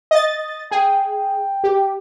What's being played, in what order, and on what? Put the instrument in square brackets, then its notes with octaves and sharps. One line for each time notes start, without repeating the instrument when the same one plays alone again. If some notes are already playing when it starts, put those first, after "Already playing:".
[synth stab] D#5 A6
[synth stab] G#4 [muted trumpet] G5
[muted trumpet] G5
[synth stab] G4